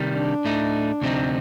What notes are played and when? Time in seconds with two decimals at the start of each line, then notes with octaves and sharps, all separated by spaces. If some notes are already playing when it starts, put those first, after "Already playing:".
Already playing: C3 D#3 G3
0.15 D4
0.45 A2 A3 D#4
1.01 D2 C3 F3 C4 D#4